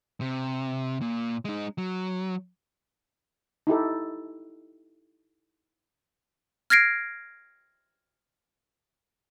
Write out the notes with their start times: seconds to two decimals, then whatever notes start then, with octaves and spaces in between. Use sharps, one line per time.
0.21 C3
1.01 A#2
1.45 G#3 D#4
1.78 F#3
3.67 D#4 E4 G4 A4
6.70 F6 G#6 A#6 C7 D7